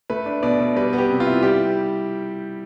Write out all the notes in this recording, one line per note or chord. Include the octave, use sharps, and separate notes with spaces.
A3 B4
D4
B2 D5
B2
G3 B4
B3
G4
C3
F4
E4
G3 G4